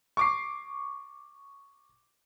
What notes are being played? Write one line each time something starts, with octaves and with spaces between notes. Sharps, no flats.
C#6 D6 C7